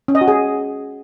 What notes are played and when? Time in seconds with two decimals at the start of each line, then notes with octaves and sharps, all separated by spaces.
0.08 C#4
0.15 D#5
0.21 F#4
0.28 G#4